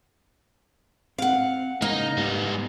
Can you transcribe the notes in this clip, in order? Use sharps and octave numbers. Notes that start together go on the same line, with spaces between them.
C4 F5 F#5
C#3 A#3 D#4
G#2 G3 B3